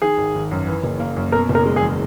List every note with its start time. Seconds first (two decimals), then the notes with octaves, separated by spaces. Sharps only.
0.02 D#3 G#4
0.18 G#1
0.35 G#1
0.51 F#2
0.67 E3
0.84 F#1
1.00 A#3
1.16 F#2
1.32 B2 A#4
1.49 F#1
1.55 A#4
1.66 G#3
1.76 G#4
1.81 E2